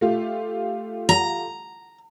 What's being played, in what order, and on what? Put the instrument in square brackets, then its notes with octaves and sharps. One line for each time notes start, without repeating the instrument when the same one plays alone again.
[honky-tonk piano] A3 F4 G4
[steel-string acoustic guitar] A#5